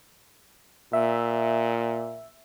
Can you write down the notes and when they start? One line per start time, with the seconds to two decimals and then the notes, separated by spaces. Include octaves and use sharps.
0.93 A#2 E5